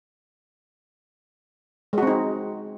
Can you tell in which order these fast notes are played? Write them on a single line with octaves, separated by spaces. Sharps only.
G#3 F#4 C4 D#4